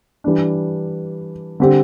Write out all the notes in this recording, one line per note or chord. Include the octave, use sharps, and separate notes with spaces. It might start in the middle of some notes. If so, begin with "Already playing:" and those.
E3 G3 D4
D3 G3 C4 G4